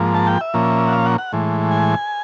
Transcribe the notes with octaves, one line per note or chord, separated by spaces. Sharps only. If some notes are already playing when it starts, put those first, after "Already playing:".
Already playing: G#2 F3 A#3
A5
G5
E5
A#2 F3 A#3 C#4
F#5
F5
F#5
F#5
A2 E3 G#3
G#5